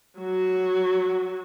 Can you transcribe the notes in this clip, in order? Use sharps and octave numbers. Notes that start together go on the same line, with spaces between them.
F#3 F#4